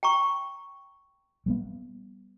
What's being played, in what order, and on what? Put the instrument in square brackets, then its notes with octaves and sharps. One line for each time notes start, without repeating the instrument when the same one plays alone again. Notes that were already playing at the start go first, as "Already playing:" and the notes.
[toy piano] G5 A#5 C#6
[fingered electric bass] G3 A3 B3